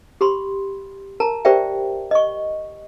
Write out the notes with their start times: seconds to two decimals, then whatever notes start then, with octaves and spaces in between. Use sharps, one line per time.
0.21 G4 B5 C6
1.20 A#4 A5 A#5
1.45 G4 A#4 C5 D5 E5 G5
2.11 D#5 C#6